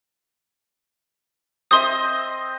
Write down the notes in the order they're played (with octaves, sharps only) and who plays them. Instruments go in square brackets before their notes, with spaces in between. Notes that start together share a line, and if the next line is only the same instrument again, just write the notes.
[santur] C4 D#5 E5 [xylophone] C6 D#6